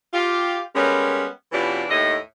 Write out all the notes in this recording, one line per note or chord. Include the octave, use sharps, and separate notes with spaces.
F4 G4 F5
G3 G#3 A#3 B3 C#4
B2 E3 C#4 D4 F4 G4
D#2 A2 D#5